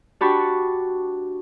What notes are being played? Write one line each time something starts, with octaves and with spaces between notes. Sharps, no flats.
D4 F#4 G4 A5 B5 C#6